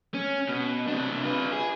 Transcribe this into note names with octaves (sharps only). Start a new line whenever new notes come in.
C#4
B2
C3 D4
F4 B4
G#4